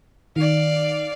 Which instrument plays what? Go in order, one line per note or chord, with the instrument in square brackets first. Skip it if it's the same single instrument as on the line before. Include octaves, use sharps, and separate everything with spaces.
[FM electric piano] D#3 [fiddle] D5 F5